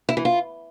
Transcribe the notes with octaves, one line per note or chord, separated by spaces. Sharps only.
E4
E3
F4